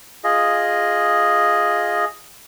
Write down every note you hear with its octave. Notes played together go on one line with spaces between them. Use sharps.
F4 G#4 D#5